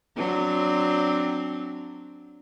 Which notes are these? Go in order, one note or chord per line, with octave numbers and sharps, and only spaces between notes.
F#3 C4 D4